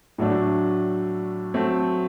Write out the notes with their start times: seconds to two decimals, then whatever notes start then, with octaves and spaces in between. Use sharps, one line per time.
0.18 A2 F#3 A3 D4
1.54 F#3 A3 C4